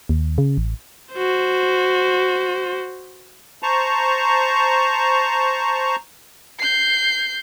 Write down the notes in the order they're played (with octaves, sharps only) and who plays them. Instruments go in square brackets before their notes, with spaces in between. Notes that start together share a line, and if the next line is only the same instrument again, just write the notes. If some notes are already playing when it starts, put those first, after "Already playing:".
[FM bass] D#2
C#3
A1
[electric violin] F#4 C5
[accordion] C5 A5 A#5 C#6
[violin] G6 C7